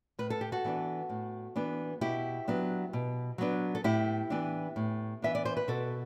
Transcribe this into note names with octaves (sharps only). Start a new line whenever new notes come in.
A2 B4
A4
G4
F#4 A4
E3 B3 D4
A2
E3 B3 D4
B2 E4 G4
F#3 B3 D4
B2
F#3 B3 D4
A4
A2 E4 G4
E3 B3 D4
A2
E3 B3 D4 E5
D5
C5
B4
B2 F#4 A4